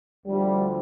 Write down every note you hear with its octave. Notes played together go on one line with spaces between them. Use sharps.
D2 D3 F3 G3